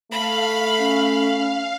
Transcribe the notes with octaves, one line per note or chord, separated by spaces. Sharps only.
A3 F5 B5
C#4